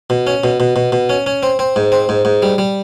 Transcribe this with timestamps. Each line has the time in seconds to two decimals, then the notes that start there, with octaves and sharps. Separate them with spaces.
0.10 B2
0.27 C#4
0.44 B2
0.60 B2
0.76 B2
0.92 B2
1.09 C#4
1.26 C#4
1.43 C4
1.59 C4
1.76 G#2
1.92 C4
2.09 G#2
2.25 G#2
2.42 G3
2.58 G3